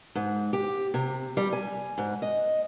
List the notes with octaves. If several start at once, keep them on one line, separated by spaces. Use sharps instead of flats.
G#2
G4
C3
G3
G#5
G#2
D#5